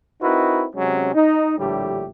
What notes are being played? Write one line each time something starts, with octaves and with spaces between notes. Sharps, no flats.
C4 D#4 E4 F#4 A#4 B4
C3 F#3 G#3 C#4
D#4
A#1 A2 D3 G3 A3 G4